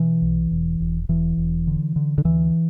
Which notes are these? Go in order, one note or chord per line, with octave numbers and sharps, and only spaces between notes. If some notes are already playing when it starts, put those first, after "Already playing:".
Already playing: B2 E3
B1
E1
E1
E1 E3
E1
D3
D3
D3
D2 E3